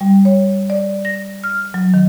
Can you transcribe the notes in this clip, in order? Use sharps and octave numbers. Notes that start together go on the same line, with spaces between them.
G3
C#5
D5
A#6
F6
F#3
D#3